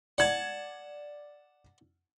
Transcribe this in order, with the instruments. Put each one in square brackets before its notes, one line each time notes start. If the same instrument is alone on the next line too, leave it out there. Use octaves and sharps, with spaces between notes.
[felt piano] D5 G#6 [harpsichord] F#5 A5